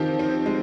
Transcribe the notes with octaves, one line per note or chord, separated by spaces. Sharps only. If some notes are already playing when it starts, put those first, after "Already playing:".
Already playing: D#3 F3 C4 G4
C4
G#3